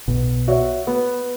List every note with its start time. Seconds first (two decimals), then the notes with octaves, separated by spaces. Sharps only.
0.08 B1 B2 B3
0.48 F#4 C#5 E5
0.87 B3